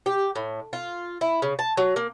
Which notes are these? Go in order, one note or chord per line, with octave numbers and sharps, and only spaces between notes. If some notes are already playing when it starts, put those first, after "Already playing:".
G4
A2
F4
E4
C#3
A5
F#3
A#3